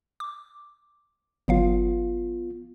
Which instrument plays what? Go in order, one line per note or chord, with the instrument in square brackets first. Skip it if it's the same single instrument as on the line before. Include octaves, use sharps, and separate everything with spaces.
[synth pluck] D6
[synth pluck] G1 F#3 F5 [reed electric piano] B3 F4